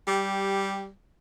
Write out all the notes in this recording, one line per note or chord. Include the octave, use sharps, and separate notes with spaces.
G3 G4